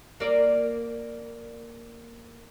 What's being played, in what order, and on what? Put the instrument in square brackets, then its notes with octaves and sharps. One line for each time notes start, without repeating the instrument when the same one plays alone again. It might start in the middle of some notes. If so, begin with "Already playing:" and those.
[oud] A#3 D5